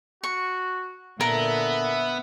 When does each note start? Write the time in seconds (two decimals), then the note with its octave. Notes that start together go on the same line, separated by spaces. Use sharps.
0.24 F#4 C#6
1.21 A#2 D3 B3 A#4 E5 A5